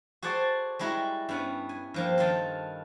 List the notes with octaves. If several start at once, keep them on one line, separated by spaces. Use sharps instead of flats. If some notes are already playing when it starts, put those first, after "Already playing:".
F#4 G#4 A4 C5 D5 A5
G3 G#3 E4 F#4 A#5
G2 B3 C#4
G#5
G2 F3 A#3
D#3 F4 A4